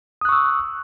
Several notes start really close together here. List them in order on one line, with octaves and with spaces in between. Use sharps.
D#6 F#6 C#6 E6